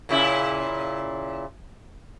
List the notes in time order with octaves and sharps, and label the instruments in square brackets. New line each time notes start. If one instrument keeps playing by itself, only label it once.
[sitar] A#2 C#3 E4